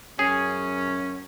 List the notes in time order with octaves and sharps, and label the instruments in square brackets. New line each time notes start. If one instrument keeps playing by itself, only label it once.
[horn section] F#2 C#4 [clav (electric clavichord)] G#4